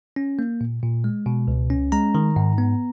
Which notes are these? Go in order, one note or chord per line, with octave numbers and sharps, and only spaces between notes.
C#4
A#3
A#2
A#2
G#3
B2
C#2
C#4
G#3 A#5
D#3
G#2
B3